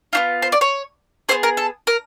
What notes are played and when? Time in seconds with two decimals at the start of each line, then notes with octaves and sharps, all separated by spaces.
0.13 B3 D4 F4
0.42 C5
0.52 D5
0.61 C#5
1.29 B3 E4 G#4 C5
1.43 A#4
1.57 A4
1.87 A#4